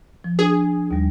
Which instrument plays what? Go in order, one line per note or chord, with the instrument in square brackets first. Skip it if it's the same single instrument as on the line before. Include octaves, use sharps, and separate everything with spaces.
[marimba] F3
[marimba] D4 [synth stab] G#4
[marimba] D#2 G3